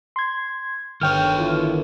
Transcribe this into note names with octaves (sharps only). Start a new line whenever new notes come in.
C6 G#6
G1 D#3 C#5 G5 F6
E3 E4 F4